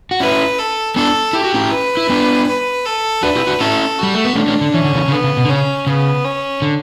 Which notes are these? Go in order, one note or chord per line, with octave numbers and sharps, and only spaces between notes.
F#4
C#4 E4 B4
A4
B3 D4 A4
E4 G4
F#4
C#4 E4
B4
E4
B3 D4
B4
A4
D4 F#4 B4
E4 G4
D4 F#4
C#4 E4 A4
G3 F#4
A3
B3
A3 C#4 D4
A3 C#4
D3
E3 C#4
D3
C#3 E3
C#3
D3 B3
C#3
B2
D3
C#3 C#4
C#3 B3
C#4
D3